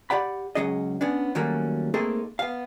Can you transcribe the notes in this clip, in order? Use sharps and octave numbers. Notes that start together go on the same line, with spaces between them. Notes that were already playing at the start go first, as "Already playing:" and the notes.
G4 D5 F#5 B5
C#2 D#3 F#3 C#4 G#4 D#5
B3 C#4 D4
D#3 F#3 G3 A3 A#3 C#4
A3 A#3 C4 D#4 G#4 A4
B3 F5